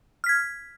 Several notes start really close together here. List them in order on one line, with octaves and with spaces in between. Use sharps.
F6 B6 G#6